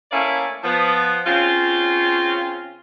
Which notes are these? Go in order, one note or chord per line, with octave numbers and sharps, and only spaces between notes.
A3 A#3 C#4 E4 D5 F5
F3 B3
C#3 C4 C#4 F4